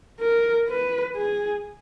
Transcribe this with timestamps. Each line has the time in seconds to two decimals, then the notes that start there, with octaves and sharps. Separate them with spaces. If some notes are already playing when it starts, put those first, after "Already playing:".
0.20 A#4
0.68 B4
1.16 G#4